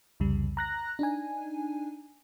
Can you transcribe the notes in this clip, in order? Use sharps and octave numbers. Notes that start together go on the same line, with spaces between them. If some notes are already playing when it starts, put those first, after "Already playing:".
C2 F2 C#3 G3
A#5 F#6 A#6
D4 D#4 G#5